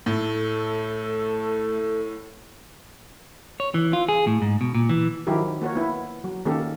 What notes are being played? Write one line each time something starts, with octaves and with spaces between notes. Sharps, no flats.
A2 A3 A4
C#5
E3
F4
G#4
A2
G#2
B2
A#2
E3
D#3 F3 F#3 E4 G4 A#4
A#3 F#4 A#4 C#5
B3 E4
F#3
D#3 A#3 C#4 G4 A4